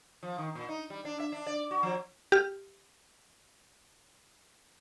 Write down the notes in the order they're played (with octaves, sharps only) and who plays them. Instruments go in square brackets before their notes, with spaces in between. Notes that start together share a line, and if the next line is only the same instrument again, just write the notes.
[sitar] F3
D#3
A#2
D#4
G3
D4
E5
D4
D5
F#4
F3
[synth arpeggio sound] G4 F6